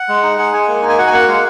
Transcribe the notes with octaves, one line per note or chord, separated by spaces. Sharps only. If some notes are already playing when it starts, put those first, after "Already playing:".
Already playing: F#5
G#3
D#4
G#4 F#5
G#3 G#5
A#3
D#4
G#5
F#4 F#5
G#5
A#3 F#5
G#3 F5